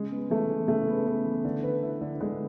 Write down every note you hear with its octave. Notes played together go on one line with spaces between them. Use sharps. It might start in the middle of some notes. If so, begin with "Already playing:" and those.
Already playing: C#3 G#3
B3
E3 A3
E3
C#3 A3
B3
B3
E3
D3
B4
E4
D3
D3 G#3